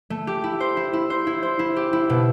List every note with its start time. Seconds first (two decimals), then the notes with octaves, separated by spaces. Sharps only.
0.10 A3
0.27 G4
0.44 E4
0.60 C5
0.77 E4
0.93 E4
1.10 C5
1.27 E4
1.43 C5
1.59 E4
1.76 G4
1.93 E4
2.10 B2